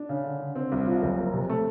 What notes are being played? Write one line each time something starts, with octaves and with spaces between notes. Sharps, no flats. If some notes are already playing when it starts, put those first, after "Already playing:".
Already playing: D4
C#3
D3
D3
C4
C2
F3
F#1
A#3
C3
A3